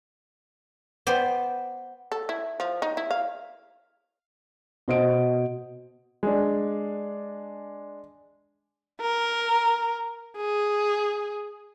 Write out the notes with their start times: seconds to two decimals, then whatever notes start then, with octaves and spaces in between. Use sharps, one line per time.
1.07 B3 C5 D5 G5
2.12 A4
2.29 E4
2.60 F3
2.82 D#4
2.97 E4
3.11 F5
4.88 B2 C5 D#5 D7
6.23 G#3 D4
9.01 A#4
10.37 G#4